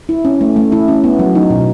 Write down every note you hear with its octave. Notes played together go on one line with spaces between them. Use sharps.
E4
C#4
A3
A3
E4
C#4
B3
F#3
D#4
B2